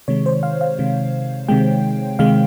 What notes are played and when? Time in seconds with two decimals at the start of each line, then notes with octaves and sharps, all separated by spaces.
0.08 C3 D#3 G#3 C#5
0.26 C5
0.43 F5
0.61 F5
0.79 C3 D#3 G#3
1.48 C3 D#3 G#3 G5
2.19 C3 D#3 G#3 F5